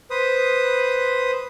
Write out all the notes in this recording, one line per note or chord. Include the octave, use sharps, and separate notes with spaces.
B4 C5 D#6